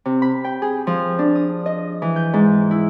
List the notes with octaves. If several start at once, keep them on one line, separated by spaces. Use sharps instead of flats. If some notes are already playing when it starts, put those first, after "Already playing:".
C3
B5
G5
G#4
F3
D4
D#6
D#5
E3
G6
G#2
E4